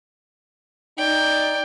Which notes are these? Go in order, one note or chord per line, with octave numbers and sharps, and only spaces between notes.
D#4 D5 G5